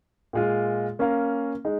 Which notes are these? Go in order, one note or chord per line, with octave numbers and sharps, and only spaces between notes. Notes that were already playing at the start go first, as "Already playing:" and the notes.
A#2 G#3 F4
A#3 C#4 A#4 F5
G#3 D#4